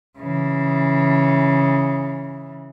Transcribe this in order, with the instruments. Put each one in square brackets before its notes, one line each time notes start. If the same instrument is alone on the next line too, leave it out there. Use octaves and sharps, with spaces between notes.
[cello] C#3 E3